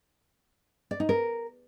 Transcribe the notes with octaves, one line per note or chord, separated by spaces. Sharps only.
D5
D#4
A#4